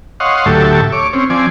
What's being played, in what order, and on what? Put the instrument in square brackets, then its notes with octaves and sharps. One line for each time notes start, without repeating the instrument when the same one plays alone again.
[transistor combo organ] C#5 D#5 F5 F#5 C6
D2 A2 F#3 G4 A4 E5
C#5 D6
C4 C#4
F3 C4 D5 G#5